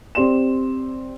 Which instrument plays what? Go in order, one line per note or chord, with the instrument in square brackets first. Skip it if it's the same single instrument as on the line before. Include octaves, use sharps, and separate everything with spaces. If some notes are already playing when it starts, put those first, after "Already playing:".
[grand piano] C4 G4 D5 C6 E7